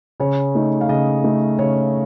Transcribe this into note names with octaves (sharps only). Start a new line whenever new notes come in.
C#3 C#5
A3 D#4
F5
C#3 D#5
A3 D#4
C#3 C#5